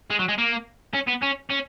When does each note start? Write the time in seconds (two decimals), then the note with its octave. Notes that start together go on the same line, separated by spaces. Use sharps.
0.10 G#3
0.19 F#3
0.29 G#3
0.38 A#3
0.94 C#4
1.08 B3
1.23 C#4
1.50 C#4